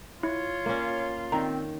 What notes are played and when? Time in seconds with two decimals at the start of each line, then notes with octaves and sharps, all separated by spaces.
0.23 E4 F4 C#5
0.66 A#3 C#4
1.32 D#3 C4 A#5